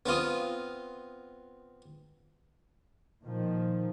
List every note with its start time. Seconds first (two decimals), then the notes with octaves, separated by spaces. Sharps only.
0.06 B3 C4 F4 D#6
3.23 A#2 D#3 F3